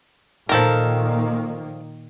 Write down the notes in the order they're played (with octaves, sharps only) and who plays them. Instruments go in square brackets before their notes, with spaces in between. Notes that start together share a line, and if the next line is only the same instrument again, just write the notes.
[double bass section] A#2 D#3 A#3 [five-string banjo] F3 A4 A#4